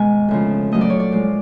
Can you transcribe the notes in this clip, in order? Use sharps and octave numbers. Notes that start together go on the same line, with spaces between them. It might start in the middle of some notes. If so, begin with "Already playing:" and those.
Already playing: G#2 B2 D#3 G#3 B3 G#5
D2 C#3 F3
A#2 F#3 A3 D#5
D5
C#5
D5
A#2 F3 G#3